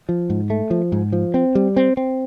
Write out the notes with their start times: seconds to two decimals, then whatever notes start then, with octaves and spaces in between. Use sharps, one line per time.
0.09 F3
0.30 G#2
0.50 A3
0.70 F3
0.92 G#2
1.13 F3
1.34 C4
1.55 G3
1.76 C4
1.97 C4